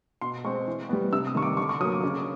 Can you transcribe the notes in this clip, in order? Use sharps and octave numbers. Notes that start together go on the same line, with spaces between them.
B2 C6
G#3 C4 C#6
E3
G3 B3
C3 E6
D#6
D#3 G3 C#6
D6
D3 C#6
C#6
F#3 A#3 D#6
D6
C#3